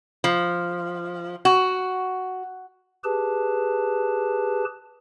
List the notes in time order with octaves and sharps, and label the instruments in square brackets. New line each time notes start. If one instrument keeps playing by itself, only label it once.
[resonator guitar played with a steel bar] F3
F#4
[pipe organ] G4 G#4 B4 A5